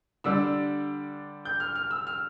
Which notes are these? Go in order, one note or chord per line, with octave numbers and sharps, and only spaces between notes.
D3 G3 D4 E6
G6
F6
F6
E6
F6